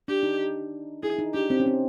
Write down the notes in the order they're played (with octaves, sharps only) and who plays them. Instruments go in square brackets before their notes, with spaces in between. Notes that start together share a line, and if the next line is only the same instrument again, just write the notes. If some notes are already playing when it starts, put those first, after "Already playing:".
[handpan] D4 [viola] G4
[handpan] D#4
[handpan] E4 [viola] G#4
[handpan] D#4
[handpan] D4 [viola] G4
[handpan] C4
C#4
C4